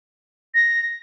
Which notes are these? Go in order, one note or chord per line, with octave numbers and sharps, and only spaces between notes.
A#6